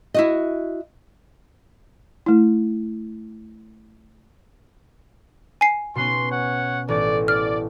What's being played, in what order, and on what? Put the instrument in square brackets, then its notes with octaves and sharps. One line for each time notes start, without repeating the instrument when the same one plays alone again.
[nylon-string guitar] E4 F#4 D#5
[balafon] A3 E4
[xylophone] G#5 C7
[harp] B2 B3 C#4 [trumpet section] C6
[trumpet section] C#5 F#5
[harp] A1 [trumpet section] D5
[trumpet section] D5 [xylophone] F6